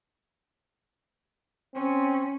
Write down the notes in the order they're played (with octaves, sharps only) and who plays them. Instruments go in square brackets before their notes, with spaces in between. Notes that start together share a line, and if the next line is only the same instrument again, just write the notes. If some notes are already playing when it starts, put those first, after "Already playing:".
[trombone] C4 [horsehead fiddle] C#4